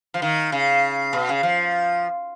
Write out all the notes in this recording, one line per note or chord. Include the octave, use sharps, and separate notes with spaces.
F3
D#3
C#3
B2
C#3
F3